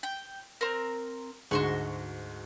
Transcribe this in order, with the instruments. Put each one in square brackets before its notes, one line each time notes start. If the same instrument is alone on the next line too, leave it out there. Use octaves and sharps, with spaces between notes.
[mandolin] G5
C4 A#4
[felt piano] D2 G#2 G#3 [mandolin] F#4 C6 C#6